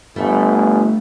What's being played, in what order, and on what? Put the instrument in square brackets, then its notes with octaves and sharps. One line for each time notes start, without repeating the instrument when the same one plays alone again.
[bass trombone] G1 [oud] G3 A3